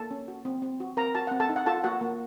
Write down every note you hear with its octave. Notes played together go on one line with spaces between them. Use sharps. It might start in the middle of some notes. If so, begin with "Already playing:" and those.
Already playing: A#3 A4 A5
C#4
F#4
C4
C4
F#4
C4 A#4 A#5
F#4 A5
C4 F#5
A4 A5
D#4
F#5
F4 A4 A5
A#3 F#4 F#5
A#3